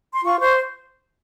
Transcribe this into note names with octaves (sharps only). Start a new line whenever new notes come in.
C6
F4 C#6
C5 C#6